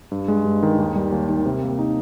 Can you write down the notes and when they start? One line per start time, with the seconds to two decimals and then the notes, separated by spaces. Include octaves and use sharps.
0.11 G2
0.28 G#3
0.45 G2
0.63 D#3
0.79 D#2
0.96 G3
1.12 D#2
1.29 D#3
1.46 C3
1.62 A#3
1.79 D#4